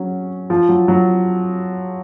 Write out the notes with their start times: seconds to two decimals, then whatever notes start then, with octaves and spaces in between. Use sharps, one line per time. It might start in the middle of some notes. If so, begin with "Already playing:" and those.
Already playing: F#3 C#4
0.50 F3
0.69 F#3
0.88 F#3